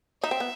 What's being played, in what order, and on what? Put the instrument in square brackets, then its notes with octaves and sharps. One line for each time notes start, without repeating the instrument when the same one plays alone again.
[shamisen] D#4 [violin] E5
[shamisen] C4
B3